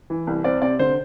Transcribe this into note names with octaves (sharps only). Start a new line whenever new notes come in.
E3
C2
C4 D5
C3 D5
D3 C5